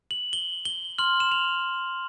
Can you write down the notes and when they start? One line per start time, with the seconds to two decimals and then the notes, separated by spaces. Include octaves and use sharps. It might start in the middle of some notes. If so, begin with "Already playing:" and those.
0.11 F#7
0.33 G7
0.65 G7
0.98 C6 F6 F#7
1.20 E7
1.31 F7